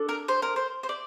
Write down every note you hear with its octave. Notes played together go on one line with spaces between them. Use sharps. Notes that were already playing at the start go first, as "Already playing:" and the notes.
Already playing: D4 A4
A#4
C5
A#4
C5
C5
D5